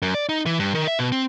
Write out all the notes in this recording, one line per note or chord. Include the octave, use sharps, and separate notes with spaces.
F#2
D5
D#4
E3
G2
D#3
E5
B2
C4